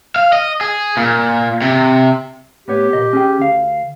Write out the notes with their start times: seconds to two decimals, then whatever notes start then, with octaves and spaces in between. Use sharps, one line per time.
0.16 F5
0.33 D#5
0.61 G#4
0.97 A#2
1.62 C3
2.68 A2 B3 G4 C#5
2.93 A#2 D#5
3.13 C#4 G#4 G5
3.39 D2 F5